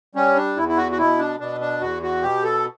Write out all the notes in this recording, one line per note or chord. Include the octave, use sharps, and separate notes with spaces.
G3 C#4
D4
E2 E4
E4
F#4
F#4
B2 E4
D4
B2 D4
D4
E2 F#4
F#4
B2 G4
A4